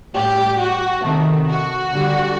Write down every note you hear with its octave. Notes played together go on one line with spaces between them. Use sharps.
A2 G3 G4
F#4
C3 D#3 A3
F#4
D3 G3